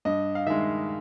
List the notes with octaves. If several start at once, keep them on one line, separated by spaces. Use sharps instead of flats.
G2 D#5
F5
D#3 G#3 E5